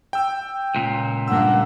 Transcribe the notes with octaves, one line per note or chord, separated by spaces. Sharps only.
G5 E6
C#2 A#2
G2 A#3 D4 F#5 E6